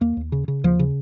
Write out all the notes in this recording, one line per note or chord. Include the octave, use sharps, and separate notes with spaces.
D#2 A#3
D#2
C#3
C#3
D#2 F3
C#3